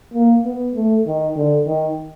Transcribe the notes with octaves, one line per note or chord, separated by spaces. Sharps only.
A#3
B3
A3
D#3
D3
D#3